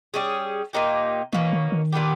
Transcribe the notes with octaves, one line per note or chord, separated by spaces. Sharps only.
G3 C#4 G#4
A#2 A#3 D#4 G4
B2 E3 A#3 C#4
D#3
D#3
A#2 G3 B3 G4